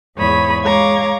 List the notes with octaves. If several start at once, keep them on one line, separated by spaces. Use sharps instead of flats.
E2 G#2 C#5 B5 D#6
G#3 C#5 F5 A#5 D6 G#6